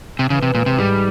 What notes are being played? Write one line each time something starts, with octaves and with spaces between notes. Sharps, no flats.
C3
C#3 E3
C3
A#2 G#3
C3
G#2 G3